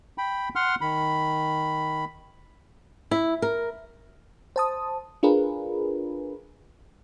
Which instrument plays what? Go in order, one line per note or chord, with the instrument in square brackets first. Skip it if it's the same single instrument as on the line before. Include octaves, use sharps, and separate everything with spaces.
[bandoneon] G5 B5
F#5 C6 F6
D#3 B5
[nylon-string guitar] E4
A#4
[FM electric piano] C5 A5 D#6
D4 F4 G#4 A#4 B4